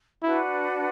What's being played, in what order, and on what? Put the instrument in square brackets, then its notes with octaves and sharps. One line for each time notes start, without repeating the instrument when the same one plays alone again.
[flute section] D4 F#4 B4 F#5 [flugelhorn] E4